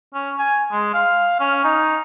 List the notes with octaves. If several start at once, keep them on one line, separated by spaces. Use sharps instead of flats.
C#4
G#5
G#3
F5
C#4
D#4